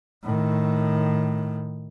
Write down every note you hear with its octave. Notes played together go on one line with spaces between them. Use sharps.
A2 D#3